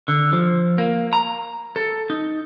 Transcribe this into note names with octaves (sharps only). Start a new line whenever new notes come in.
D3
F3
A#3
A#5
A4
D#4